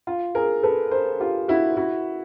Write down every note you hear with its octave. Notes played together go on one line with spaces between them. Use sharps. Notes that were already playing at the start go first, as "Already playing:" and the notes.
F4
G#4 A#4
A4 B4
A#4 C5
F4 G4
E4 F#4
E4 F#4